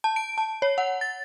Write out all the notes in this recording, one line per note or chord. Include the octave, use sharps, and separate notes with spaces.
A5
D7
A5
C#5
F#5
A6